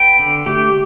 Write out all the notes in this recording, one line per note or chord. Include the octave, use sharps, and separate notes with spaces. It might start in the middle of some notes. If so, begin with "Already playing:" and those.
Already playing: B3 G5
D3
A3 G4